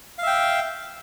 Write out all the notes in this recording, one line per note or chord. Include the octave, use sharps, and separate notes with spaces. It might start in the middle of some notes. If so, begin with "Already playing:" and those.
E5 F5 G5